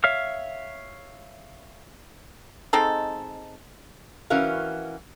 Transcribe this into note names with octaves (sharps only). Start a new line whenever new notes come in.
C#5 E5 F5 F6
G#3 C4 D#4 A4
E3 C#4 F#4 A#4 F5